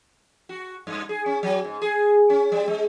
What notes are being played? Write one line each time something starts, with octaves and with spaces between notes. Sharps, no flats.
F#4
G2
G#4
C#4
F#3
G#2
G#4
C#4
G3
G#3